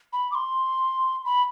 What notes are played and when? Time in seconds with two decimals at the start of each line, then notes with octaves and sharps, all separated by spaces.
0.13 B5
0.32 D6
0.35 C6
1.25 B5